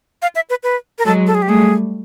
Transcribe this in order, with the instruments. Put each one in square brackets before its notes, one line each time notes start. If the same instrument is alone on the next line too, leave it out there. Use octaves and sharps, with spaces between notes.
[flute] F5
E5
B4
B4
A#4
[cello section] F#3 G#3 [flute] A4
[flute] A4
G#4
G4
[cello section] G3 A3 [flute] G#4